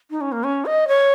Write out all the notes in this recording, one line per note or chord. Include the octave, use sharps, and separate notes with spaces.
D#4
C#4
A#3
C#4
D#5
C#5